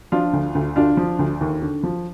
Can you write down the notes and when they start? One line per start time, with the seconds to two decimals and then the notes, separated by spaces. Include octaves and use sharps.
0.12 F3 D4 F4
0.33 D2
0.55 D2
0.76 D3 D4 F4
0.97 F3
1.19 D2
1.41 D#2
1.62 D3
1.83 F3